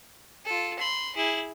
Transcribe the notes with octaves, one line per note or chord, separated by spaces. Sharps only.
F4 A4
B5 C6
E4 G#4